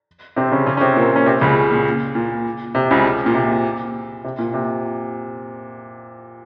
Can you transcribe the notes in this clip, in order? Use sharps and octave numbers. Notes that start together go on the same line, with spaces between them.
C3 C4
C#3 C#4
C#3 C#4
C#4
C3 C4
A#2 A#3
C#4
C3 C4
C#2 C#3
A#2
A#2
C3
C#2 C#3
A#2
C3
C3
A#2
C3